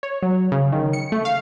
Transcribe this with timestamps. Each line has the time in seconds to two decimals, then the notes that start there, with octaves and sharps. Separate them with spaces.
0.03 C#5
0.22 F#3
0.52 C#3
0.72 D#3
0.93 C#7
1.12 A3
1.25 F5